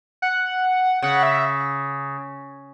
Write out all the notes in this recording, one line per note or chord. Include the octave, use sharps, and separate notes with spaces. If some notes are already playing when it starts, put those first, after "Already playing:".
F#5
C#3 F#5
E5